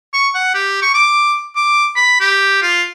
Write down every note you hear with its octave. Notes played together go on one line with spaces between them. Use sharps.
C#6
F#5
G4
C#6
D6
D6
B5
G4
F4